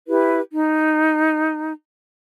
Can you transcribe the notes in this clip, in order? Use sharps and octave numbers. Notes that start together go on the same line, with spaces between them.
E4 G4 B4
D#4